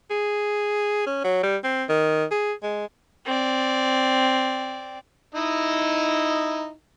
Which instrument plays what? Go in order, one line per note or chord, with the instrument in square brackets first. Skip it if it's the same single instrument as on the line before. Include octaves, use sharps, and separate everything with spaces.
[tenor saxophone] G#4
C#4
F#3
G3
C4
D#3
G#4
G#3
[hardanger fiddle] C4 D5
[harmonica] D#4 E4 D#5